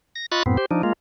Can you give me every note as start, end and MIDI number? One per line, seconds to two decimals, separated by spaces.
0.16 0.26 94
0.32 0.43 65
0.32 0.43 75
0.32 0.43 83
0.32 0.43 85
0.32 0.43 90
0.32 0.43 93
0.46 0.57 42
0.46 0.57 45
0.46 0.57 59
0.46 0.57 60
0.58 0.66 67
0.58 0.66 72
0.71 0.82 53
0.71 0.82 62
0.71 0.82 63
0.83 0.93 56
0.83 0.93 58
0.83 0.93 65